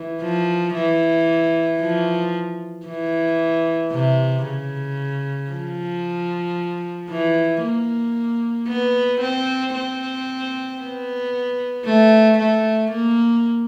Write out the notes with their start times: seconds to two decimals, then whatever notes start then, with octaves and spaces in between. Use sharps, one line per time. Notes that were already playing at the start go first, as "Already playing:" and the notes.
Already playing: E3
0.22 F3
0.74 E3
1.80 F3
2.86 E3
3.92 C3
4.45 C#3
5.51 F3
7.10 E3
7.62 A#3
8.68 B3
9.21 C4
9.74 C4
10.80 B3
11.85 A3
12.38 A3
12.91 A#3